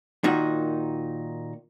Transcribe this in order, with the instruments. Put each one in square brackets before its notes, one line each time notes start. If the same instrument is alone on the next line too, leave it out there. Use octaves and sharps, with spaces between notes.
[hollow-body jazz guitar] A#2 D#3 D#4 F#4